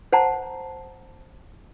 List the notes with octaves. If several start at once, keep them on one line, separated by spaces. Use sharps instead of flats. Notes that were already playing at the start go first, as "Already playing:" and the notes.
C5 F#5 A5 A#5